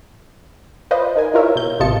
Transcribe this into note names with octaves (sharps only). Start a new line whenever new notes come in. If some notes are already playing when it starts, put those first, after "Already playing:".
F4 B4 C5 D5 D#5
D#4 A#4 G#5
E4 F4 A#4 C#5 E5
B2 G6
A1 C3 F4 D#5 A5 C#7